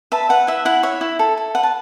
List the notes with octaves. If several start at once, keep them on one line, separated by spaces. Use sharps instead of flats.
B4 E5 A5
B4 F#5
E4 E5
E4 F#5
C#5 E5
E4
A4
A4
B4 F#5
A5